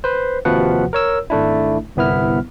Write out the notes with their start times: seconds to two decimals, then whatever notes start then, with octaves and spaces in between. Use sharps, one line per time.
0.04 B4 C5
0.45 D#2 C3 F3 F#4 B4 F#5
0.93 A#4 C#5 E6
1.30 G#1 A3 D4 E4
1.96 G1 C2 B3 E4 F6